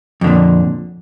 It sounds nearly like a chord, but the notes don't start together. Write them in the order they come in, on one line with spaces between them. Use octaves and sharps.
F2 D3 A#2